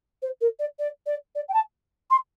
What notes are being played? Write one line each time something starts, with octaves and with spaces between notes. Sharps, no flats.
C5
A#4
D5
D5
D5
D5
G5
A5
C6